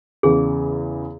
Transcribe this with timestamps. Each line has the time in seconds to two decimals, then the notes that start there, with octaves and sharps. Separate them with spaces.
0.23 E2 C#3 E3 G#4